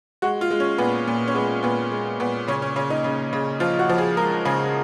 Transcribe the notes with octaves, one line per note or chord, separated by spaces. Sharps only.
G#3 F#4
F4
G#3
C#4
A#2 B3
A#2
C#4
G#3 B3
A#2 B3
G#3
A#2 B3
C#3 C#4
C#4
C#3 C#4
D#4
C#3
C#3
F3 F4
F#4
F3
G#4
G#3 A#4
C#3 G#4